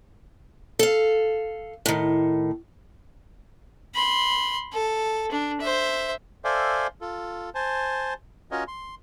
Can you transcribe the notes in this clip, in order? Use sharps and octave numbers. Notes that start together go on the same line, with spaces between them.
A4 F5
A2 D#3
B5 C6
A4
D4
C5 E5
A4 C5 D5 E5 F5 G#5
F4 A4
C5 G#5 A5
C#4 F4 F#4 A#4 C#5 D#5
C6